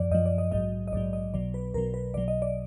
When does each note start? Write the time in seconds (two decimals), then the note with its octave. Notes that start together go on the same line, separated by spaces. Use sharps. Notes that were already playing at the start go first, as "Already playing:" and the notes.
Already playing: F#2 F3 D5
0.11 F#2 F3 D#5
0.26 D5
0.38 D#5
0.52 A#1 G#2 F#3 D#5
0.88 D#5
0.92 A#1 G#2 F#3 D5
1.13 D#5
1.34 B1 B2 F#3 D5
1.54 B4
1.74 B1 B2 F#3 A#4
1.94 B4
2.14 B1 B2 F#3 D5
2.28 D#5
2.42 D5